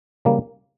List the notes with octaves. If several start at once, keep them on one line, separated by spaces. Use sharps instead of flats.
C#3 E3 G3 A#3